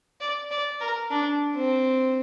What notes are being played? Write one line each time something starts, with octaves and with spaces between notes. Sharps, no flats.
D5
D5
A#4
D4
C4